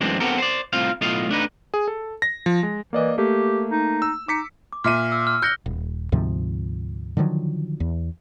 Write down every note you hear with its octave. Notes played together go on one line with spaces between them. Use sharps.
F#2 E3 G#3 A3 C4 D4
B3 C4 F#4 G4 A4 A#4
C5 D5
C2 A2 C4 F4 F5
B1 A2 A3 F4 D#5 F5
A3 D4 D#4 B4
G#4
A4
A#6
F3
G#3
E3 A#3 D5 D#5
A3 A#3 G4
D#4
E6
D#4 D6 B6 C#7
D6
A#2 E5 F6 D#7
E6
F6
F#6 G6 A#6 C#7 G7
D#1
D2 G#2 C3 F3
D3 D#3 F3 F#3
E2